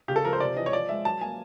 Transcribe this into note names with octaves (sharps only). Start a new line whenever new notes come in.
C#3 G4
A4
F3 A#4
C5
C3 D5
E3 D#5
C#5
F3 D5
G#3 E5
F#3 A5
A#3 G#5